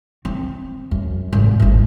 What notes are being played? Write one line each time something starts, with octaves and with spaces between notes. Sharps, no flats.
C4
F#2
G#1
D1 G#1